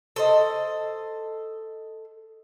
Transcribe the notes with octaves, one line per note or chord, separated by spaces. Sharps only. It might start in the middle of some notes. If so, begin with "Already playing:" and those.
A4 C5 D#5